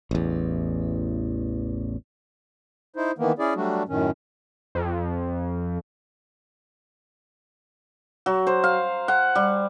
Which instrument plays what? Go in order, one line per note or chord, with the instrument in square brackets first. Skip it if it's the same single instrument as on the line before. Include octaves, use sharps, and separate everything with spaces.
[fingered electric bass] A1 E2
[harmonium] D#4 E4 C5
D#3 E3 A#3 B3
C#4 E4 G#4 D5
F#3 G3 A3 D4 F#4
F#2 A2 D#3 C#4
[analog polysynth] F2
[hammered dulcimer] F#3
C5
F5
F#5
G3